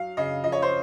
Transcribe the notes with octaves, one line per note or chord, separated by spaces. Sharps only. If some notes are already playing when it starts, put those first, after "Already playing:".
Already playing: F#3 F5
C#3 D#5
F3 D#5
C#5
C5